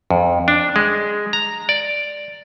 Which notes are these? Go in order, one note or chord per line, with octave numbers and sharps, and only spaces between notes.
F2
D4
G#3
A#5
D5